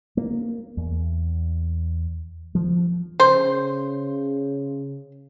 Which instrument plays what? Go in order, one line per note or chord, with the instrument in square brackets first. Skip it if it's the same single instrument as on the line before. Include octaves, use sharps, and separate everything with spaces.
[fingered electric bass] A#3
E2
F3
[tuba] C#3 [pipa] C5